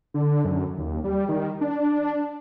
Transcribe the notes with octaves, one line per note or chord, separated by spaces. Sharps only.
D3
F#2
D#2
G3
D#3
D4